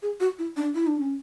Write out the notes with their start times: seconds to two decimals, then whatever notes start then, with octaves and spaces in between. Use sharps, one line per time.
0.02 G#4
0.20 F#4
0.39 E4
0.57 D4
0.75 E4
0.87 D4
1.00 C#4